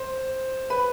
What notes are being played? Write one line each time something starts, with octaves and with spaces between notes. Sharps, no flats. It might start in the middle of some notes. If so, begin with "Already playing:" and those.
Already playing: C5
B4